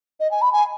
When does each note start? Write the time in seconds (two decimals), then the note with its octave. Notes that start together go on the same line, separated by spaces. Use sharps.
0.20 D#5
0.31 G#5
0.41 B5
0.53 G#5